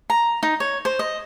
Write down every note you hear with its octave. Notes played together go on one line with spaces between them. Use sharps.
A#5
D#4
C#5
C5
D#5